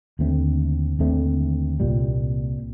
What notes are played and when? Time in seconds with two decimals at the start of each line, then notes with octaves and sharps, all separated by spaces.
0.19 D#2 D3 A3 C4
0.99 D#2 D3 A3 C4
1.80 C2 A#2 G3